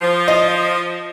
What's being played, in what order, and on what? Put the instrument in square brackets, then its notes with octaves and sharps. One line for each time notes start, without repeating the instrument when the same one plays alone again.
[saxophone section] F3
[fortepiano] D#5